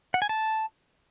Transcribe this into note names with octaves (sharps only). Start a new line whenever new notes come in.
F#5
G#5
A5